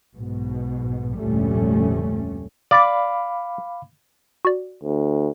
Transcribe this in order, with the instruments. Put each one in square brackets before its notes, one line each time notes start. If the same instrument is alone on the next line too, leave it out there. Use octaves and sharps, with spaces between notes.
[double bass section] B1 G#2 B2
F1 D2 A#2 G3 A3 C#4
[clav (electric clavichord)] D5 [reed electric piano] F5 B5 D6
[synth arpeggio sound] F#4 D5
[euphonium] D2